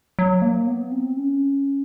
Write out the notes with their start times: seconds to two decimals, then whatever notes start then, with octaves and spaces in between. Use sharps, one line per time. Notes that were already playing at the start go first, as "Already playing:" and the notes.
0.19 F#3
0.42 A#3
0.67 B3
0.92 C4
1.16 C#4